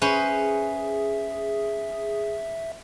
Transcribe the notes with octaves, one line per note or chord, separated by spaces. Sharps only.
C#4 G#4 B4 C5 E5